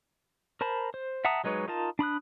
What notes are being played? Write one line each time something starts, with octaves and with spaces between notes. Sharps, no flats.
A#4 C5 A5 B5
C5
E5 F#5 A5 A#5 D#6
F#3 G#3 D#4 B4 C#5
D#4 F4 A#4 A5
D4 B5 D#6 F#6